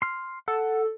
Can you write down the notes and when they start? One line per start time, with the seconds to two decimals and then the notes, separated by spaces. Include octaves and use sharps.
0.02 C6 F6
0.48 A4 F#5